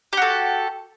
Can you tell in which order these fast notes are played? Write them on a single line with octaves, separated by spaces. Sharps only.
G4 F#4 A4